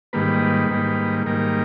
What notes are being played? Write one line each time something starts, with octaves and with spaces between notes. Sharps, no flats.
G#2 D#3 G3 A#3 B4
G#2 D#3 G3 A#3
G#2 D#3 G3 A#3 A#4